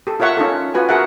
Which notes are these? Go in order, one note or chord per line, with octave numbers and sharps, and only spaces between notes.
G4 A4
F4 A#4 C#5 E5 F#5 C#6
C#4 D#4 F4 A4
F4 F#4 B4 F#5 G#5
F#4 G#4 A#4 E5 F#5